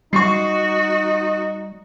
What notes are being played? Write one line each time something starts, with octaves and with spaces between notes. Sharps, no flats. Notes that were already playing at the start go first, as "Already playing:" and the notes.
G3 D#4 F#4 C#6 C7